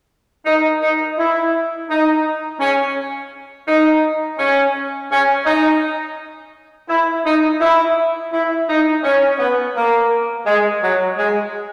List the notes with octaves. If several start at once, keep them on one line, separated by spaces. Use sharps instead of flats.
D#4
D#4
E4
D#4
C#4
D#4
C#4
C#4
D#4
E4
D#4
E4
E4
D#4
C#4
B3
A#3
G#3
F#3
G#3